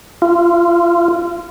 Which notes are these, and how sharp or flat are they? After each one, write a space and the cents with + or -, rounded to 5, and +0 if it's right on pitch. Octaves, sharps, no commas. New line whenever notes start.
F4 -25